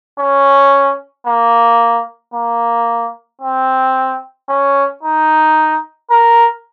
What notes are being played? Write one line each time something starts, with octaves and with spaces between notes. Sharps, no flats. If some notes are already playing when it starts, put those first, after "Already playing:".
C#4
A#3
A#3
C4
C#4
D#4
A#4